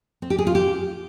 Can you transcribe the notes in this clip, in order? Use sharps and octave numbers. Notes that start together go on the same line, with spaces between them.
C4
G4
G#4
F4
G4